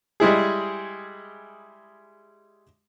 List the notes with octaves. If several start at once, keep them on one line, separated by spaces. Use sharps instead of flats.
G3 G#3 E4 G#4